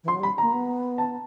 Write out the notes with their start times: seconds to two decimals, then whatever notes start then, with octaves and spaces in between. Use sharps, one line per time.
0.04 E3
0.08 F3 C6
0.14 F#3
0.20 G3
0.23 B5
0.38 A#3 A#5
0.53 B3
0.98 A5